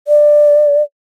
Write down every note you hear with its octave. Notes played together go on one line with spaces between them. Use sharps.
D5